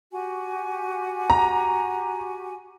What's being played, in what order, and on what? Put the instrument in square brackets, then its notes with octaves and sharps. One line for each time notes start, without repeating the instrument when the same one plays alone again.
[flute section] F#4 G4 G#5
[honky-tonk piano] A#5